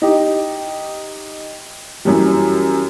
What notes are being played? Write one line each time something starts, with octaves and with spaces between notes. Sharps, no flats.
D#4 G4
F#2 E3 G3